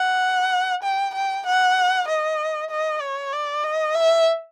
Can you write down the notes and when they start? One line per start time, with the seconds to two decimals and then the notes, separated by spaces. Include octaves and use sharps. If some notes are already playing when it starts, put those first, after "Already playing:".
Already playing: F#5
0.83 G5
1.15 G5
1.47 F#5
2.08 D#5
2.71 D#5
3.01 C#5
3.33 D5
3.64 D#5
3.95 E5